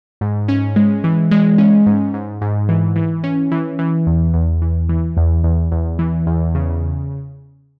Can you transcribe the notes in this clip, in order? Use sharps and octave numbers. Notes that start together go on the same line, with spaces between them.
G#2
C#4
G#3
E3
G#3
C#4
G#2
G#2
G#2
E3
E3
C#4
E3
E3
E2
E2
E3
E3
E2
E2
E2
E3
E2
C#3